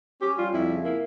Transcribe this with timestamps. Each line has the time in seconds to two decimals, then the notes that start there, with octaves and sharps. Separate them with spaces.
0.21 C#4 G4
0.37 G3 F4
0.53 F2 E4
0.69 C#3
0.84 A#3 E4